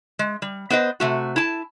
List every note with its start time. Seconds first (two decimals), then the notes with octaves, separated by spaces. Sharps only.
0.19 G#3
0.42 G3
0.70 B3 B4 C5 D#5
1.00 C3 A3 F#4
1.36 E4 A5